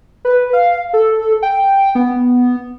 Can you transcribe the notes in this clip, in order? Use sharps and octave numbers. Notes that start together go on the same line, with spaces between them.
B4
F5
A4
G5
B3